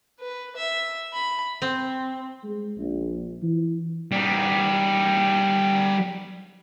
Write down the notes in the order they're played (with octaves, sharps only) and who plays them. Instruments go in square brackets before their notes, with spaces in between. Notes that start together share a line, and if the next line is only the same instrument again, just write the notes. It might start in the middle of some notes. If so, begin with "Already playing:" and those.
[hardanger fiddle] B4
E5
B5
[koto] C4
[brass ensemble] G#3
A#1
E3
[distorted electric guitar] G3 D#4